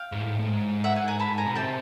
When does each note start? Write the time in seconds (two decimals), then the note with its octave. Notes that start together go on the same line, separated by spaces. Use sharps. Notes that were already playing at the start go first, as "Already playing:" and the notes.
Already playing: F5 G5
0.12 G#2
0.22 A2
0.30 G#2
0.39 A2
0.48 G#2
0.84 E5 F#5
0.95 F#5 G#5
1.08 G#5 A#5
1.19 A5 B5
1.38 G#5 A#5
1.46 B2
1.55 C3 G5 A5